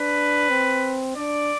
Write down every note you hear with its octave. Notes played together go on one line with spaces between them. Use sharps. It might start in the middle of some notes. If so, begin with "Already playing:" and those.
Already playing: D4 B4
C4
D4 D5